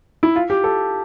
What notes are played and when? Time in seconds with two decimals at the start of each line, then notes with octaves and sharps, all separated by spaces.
0.23 E4
0.36 F4
0.50 G4
0.64 A4